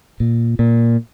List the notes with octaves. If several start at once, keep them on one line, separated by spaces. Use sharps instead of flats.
A#2
A#2